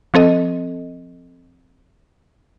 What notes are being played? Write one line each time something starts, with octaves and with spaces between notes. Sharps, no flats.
F3 C4 A4 D#5